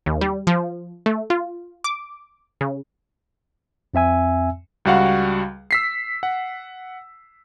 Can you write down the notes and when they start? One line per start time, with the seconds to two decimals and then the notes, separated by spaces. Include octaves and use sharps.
0.06 D#2
0.21 G3
0.47 F3
1.06 A3
1.30 F4
1.84 D6
2.61 C#3
3.94 F2 C4 E5 G#5 E6
4.85 C#2 G3 F#4 F5 F#5
5.71 E6 B6 C7
6.23 F#5